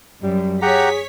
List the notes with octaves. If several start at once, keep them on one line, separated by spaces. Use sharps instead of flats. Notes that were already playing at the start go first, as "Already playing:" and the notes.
F#2 G3
G4 G#4 C#5 F#5 A#5 B6